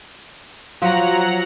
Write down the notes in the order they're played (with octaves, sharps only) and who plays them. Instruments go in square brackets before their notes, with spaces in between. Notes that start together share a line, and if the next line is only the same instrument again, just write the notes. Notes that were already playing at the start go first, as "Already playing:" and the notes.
[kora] F3 [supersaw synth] F#3 F#5 A#5